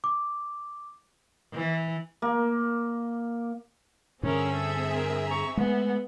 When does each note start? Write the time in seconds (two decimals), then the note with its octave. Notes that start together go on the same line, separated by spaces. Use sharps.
0.04 D6
1.53 E3
2.22 A#3
4.23 G2 D3 C4 C#4 G#4 A#4 E5
4.54 A4
4.95 A#4
5.27 A#5 C#6
5.57 G#3 A3 B3